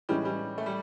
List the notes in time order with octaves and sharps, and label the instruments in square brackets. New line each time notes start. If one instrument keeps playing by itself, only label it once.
[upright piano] A2 E3 G#3 C#4 [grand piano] G3
[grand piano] G3
A3
G3